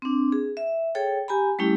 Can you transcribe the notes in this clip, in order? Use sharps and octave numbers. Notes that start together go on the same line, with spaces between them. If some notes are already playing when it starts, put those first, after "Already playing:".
C4 D4
G#4
E5
G#4 A4 C#5 G5
G4 G#5 A#5 B5
G3 A3 C#4 E4 G4